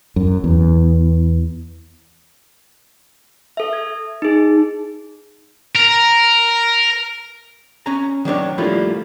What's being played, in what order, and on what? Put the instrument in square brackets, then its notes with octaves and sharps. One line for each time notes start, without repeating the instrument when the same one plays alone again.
[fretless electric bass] F#2
E2
[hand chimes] A4 E5
G#6
D#4 G#4
[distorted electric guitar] A#4
[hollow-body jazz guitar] C#4 G#5 A#5
D#3 F#3 D4 C#5
F3 G3 A3 A#3 E4 F4